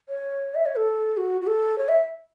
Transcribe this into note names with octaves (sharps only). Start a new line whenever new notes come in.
C#5
E5
C#5
A4
F#4
F#4
A4
C#5
E5